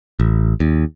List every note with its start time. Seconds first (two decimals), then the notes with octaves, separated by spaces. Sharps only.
0.20 A1
0.60 D#2